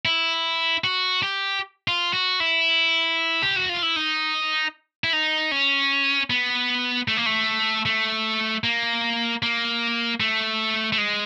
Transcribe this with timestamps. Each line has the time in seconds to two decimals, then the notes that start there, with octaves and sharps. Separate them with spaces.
0.05 E4
0.84 F#4
1.23 G4
1.88 F4
2.13 F#4
2.40 E4
3.42 G4
3.56 F#4
3.69 F4
3.83 E4
3.96 D#4
5.04 E4
5.13 D#4
5.51 C#4
6.30 B3
7.08 A3
7.17 A#3
7.26 A3
7.86 A3
8.64 A#3
9.43 A#3
10.20 A3
10.92 A3
10.98 G#3